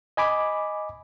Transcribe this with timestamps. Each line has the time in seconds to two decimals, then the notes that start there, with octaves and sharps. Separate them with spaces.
0.17 D#5 G#5 B5 D6